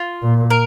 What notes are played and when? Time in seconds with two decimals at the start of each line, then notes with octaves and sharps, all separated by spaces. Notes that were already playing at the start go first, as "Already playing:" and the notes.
Already playing: F4
0.22 A#2
0.50 A#4